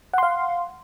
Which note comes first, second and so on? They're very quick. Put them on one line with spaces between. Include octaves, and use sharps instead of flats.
F#5 C6 F5